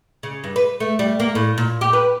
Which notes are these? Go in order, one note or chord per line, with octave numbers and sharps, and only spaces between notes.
C#3
G2
B4
A3
G3
A#3
A2
A#2
G4
B4